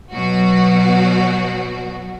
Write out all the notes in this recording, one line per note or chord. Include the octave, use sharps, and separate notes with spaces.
B2 F#3 F#4